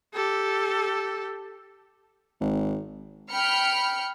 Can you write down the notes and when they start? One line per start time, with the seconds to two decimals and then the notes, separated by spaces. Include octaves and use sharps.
0.14 G4 A4
2.41 G#1
3.30 G5 B5 F6 C#7